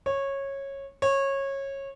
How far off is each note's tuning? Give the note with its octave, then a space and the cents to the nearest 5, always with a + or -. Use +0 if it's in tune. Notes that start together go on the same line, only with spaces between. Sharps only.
C#5 -15
C#5 -20